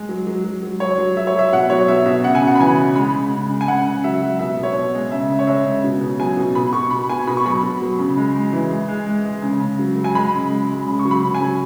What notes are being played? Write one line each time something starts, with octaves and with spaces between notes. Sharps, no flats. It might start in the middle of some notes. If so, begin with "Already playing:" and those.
Already playing: G#3
F#3
F#3
F#3
F#3
F#3 C#5
F#3
F#3 E5
C#5
F#3 E5
B2 F#5
F#3 C#5
B2 E5
B2 E5
C#3 F#5
G#5
C#3
F#5
B5
E3 G#5
C#3
G#3 B5
C#3
C#3
G#3
G#5
C#3 F#5
C#3
F#3 E5
F#3
B2 E5
B2
C#5
B2
G#3
C#3 E5
C#3
C#5
G#3 E5
C#3
B2
B2
F#3 G#5
B2
B2 B5
B2 C#6
B2 B5
B2 G#5
B2 B5
C#6
F#3 B5
B2
F#3
C#3
G#3
G#3
E3
G#3
G#3
G#3
G#3
C#3
C#3
F#3
F#3
G#5
G#3 B5
C#3
G#3
G#3
C#3
C#6
F#3
B5
C#3
G#5
F#3